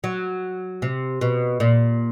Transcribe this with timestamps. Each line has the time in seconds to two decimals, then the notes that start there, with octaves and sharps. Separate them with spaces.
0.04 F#3
0.82 C3
1.21 B2
1.60 A#2